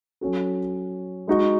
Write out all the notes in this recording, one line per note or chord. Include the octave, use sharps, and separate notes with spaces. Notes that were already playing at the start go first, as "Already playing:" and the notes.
F#3 C#4 F#4 A4
G#3 D#4 F#4